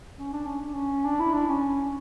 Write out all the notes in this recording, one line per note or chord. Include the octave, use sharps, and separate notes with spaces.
C#4
D4
C#4
D4
C#4
D4
E4
D4
C#4